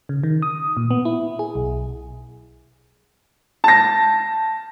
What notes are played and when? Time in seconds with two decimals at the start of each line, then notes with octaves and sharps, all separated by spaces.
0.09 C#3
0.23 D#3
0.42 D#6
0.77 A#2
0.91 B3
1.05 E4
1.39 G#4
1.55 B1
3.64 A5 A#6